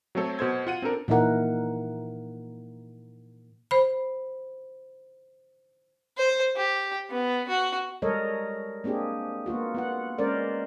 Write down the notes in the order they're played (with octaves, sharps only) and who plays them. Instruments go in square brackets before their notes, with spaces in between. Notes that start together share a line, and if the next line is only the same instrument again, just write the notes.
[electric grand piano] F#3 A3 C4 A4 C#5
B2 A4 C5 G#6
F4 F#5 D#7
C4 D4 A4 A#4
[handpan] A#2 E3 D#4 E4 A#4 F#5
[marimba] C5 B5
[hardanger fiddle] C5
G4
B3
F#4
[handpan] G3 G#3 A4 A#4 C#5 D#5
A#3 C4 D4 G4 G#4
A#3 B3 F4 F#4
B3 F4 F#5
G#3 C#4 A#4 C5 D5